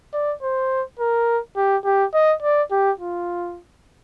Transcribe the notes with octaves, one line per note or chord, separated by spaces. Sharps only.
D5
C5
A#4
G4
G4
D#5
D5
G4
F4